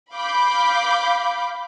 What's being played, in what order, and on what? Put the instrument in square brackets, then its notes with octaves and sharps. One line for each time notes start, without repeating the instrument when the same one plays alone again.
[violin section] F5 B5 D6 G6